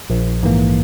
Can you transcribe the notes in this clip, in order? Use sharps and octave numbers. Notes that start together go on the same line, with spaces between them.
A#1
G#2 E3 A#3